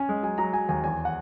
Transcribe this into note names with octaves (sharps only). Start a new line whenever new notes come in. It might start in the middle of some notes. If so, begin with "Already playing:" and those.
Already playing: C#4 G#5
G#3
F#3 G#5
F#3 A#5
F#3 G#5
D#2 G#5
E2 G#5
F#5